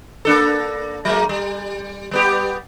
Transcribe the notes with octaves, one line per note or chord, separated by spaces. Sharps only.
A#3 D4 A4
F#3 G#3 A#3
G3
G3 B3 G4